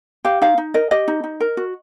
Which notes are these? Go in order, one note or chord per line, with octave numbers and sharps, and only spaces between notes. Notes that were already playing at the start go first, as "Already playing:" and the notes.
G4 F5
D#4 F5
D#4
A#4 D#5
G4 D#5
D#4
D#4
A#4
F#4